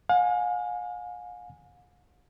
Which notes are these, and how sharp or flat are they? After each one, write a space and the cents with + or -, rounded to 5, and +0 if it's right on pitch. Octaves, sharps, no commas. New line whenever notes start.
F5 +45 G#5 +0